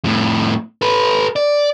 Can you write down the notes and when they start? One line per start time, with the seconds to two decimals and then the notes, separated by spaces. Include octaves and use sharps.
0.04 F2 A2
0.82 A4 B4
1.36 D5